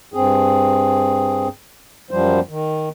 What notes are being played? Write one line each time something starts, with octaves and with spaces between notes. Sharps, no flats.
G2 C4 G#4
F#2 F3 G3 C5
D#3